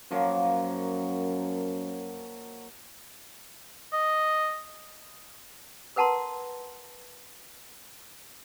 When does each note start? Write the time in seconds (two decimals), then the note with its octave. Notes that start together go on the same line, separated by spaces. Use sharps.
0.11 F#2 F3 F#3 A#3
3.93 D#5
5.96 A#4 B4 F#5 A5 A#5 C6